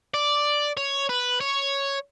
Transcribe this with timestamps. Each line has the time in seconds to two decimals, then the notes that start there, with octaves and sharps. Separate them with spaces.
0.14 D5
0.77 C#5
1.09 B4
1.41 C#5